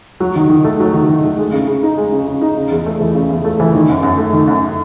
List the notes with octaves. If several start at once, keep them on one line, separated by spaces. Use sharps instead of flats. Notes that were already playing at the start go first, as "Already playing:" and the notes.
F#3
D#3
D#3
A3
F#3
D#3
D#3
A3
G#3
C#3
C#3
D#4
G#3
C#3
C#3
D#4
C#3
E2
A3
E3
C#3
E2
A3
E3
D#3
F#2
F#2
A3
D#3
F#2